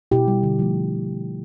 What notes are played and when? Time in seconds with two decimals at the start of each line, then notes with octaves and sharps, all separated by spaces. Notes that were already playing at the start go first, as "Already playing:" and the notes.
0.11 B2 E4 G4
0.28 G3
0.43 D3
0.59 F3 A3